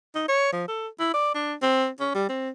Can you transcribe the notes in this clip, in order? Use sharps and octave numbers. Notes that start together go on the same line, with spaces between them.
D#4
C#5
F3
A4
E4
D5
D4
C4
C#4
G3
C4